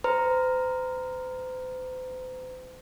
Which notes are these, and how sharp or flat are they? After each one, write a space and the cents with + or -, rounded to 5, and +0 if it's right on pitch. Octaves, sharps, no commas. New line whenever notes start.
C5 -40 A#5 +0